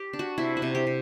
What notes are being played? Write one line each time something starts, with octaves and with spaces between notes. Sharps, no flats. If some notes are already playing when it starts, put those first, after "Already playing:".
Already playing: G4
D4
F#4
C3 E4
F#4
C3
G4
C3